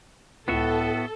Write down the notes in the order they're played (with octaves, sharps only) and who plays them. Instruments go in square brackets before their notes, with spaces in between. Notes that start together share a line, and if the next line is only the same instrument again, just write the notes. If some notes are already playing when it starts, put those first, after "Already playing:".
[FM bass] C#2 [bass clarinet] A2 [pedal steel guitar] B3 F#4 E5 [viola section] A4